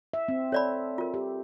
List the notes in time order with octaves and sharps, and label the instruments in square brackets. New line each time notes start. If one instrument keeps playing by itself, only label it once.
[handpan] E5
C4
[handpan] A4 [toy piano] C#5 D5 B5
[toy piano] F4 A#4
[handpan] G4